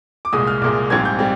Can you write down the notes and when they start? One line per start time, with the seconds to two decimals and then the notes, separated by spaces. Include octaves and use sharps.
0.25 D6
0.33 C2 A#2 G#3 D#6
0.47 F6
0.62 C2 A#2 G#3 D6
0.90 A#1 G#2 G3 C4 G#6
1.05 G6
1.19 G3 C4